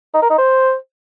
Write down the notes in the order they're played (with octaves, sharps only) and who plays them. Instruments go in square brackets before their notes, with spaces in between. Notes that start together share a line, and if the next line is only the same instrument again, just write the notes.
[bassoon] D#4
A#4
D#4
C5